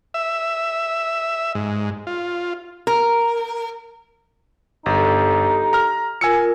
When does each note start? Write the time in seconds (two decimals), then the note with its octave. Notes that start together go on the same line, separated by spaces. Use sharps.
0.14 E5
1.55 G#2
2.07 F4
2.87 A#4
4.86 G1 D#4 G4 A4
5.73 A#5 F6
6.21 F4 A#4 G#5 E6 C#7